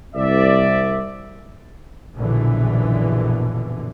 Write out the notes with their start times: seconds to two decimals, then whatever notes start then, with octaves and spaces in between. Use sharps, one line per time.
0.15 C2 D5 E5
2.16 A#1 F#2 B2 D3 E3